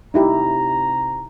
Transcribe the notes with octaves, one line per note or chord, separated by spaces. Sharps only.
C3 D#4 E4 G4 A#5